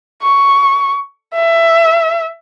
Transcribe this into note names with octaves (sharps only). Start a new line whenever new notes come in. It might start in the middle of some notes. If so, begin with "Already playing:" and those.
C#6
E5